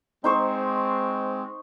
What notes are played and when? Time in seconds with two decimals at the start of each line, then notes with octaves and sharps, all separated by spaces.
0.24 G#3 C4 D#4 C5 C#6